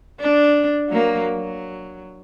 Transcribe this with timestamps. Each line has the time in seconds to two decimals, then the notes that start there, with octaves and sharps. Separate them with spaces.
0.20 D4
0.89 F#3 A#3
1.34 F#3